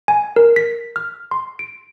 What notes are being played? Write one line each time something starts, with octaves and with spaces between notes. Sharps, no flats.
G#5
A#4
B6
F6
C6
D7